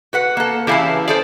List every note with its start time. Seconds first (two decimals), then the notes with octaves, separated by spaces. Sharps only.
0.13 F#4 B4 F#5
0.37 A#3 A4
0.67 C#3 E3 E4 G4 F5 A5
1.08 G#4 A4 C5 D5